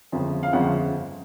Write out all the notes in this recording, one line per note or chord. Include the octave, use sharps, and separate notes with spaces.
G1 F2 C#3 F3
F5
G1 F2 C#3 F3 F#5